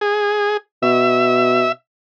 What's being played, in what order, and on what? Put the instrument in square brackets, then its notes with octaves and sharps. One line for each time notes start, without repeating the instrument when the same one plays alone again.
[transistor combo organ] G#4
[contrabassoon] B2 [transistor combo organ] E5